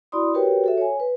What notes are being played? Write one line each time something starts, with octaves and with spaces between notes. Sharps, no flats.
E4 F#4 D5 B5 C6 D#6
F#4 G4 A#4 B4 C#5 G5
F#4 A4 E5
C#5 G#5
B4